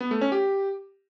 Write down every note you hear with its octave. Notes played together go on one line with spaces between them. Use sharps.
B3
A3
C#4
G4